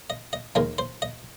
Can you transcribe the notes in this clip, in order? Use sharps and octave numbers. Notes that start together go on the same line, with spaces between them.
D#5
D#5
D#2 D#3 G#3 D#4 A#4
C5
D#5